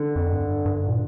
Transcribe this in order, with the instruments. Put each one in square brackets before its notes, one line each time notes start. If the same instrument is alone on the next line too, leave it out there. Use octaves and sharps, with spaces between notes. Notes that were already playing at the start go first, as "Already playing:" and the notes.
Already playing: [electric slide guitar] D3
[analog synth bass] F2
G2
G2
A#2